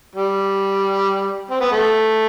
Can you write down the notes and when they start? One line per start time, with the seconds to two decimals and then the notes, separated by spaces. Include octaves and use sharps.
0.15 G3
1.50 C4
1.61 B3
1.72 A3